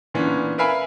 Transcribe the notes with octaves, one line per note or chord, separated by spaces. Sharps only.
A#2 E3 B3 C#4 D4
A#4 B4 E5 F5 G#5 B5